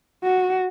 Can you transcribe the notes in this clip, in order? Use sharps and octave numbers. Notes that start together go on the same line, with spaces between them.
F#4